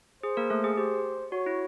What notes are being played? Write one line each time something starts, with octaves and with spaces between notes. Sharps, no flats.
G#4 C5
A#3 A#4
A3 A4
G#4
G4 C5
F#4 C#5
E4